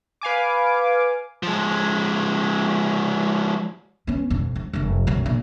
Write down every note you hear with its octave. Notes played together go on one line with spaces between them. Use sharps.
B4 F5 G#5 D6
F3 G#3
B3 C#4
F2 B2
F2
F1 F#2
B1 F#2
A#2